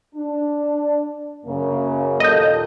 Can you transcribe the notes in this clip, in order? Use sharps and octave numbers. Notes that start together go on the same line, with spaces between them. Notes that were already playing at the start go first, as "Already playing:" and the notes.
D4
F#2 C#3 A#3
D#2 A#2 A4 D#5 G6